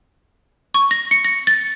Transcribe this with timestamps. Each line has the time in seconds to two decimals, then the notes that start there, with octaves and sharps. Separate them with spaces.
0.74 C#6
0.91 A#6
1.11 C#7
1.25 A#6
1.47 A6